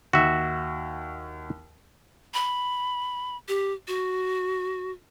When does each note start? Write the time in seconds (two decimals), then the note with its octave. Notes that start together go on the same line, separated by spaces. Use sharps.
0.13 D#2 F#4 E5
2.34 B5
3.48 G4
3.88 F#4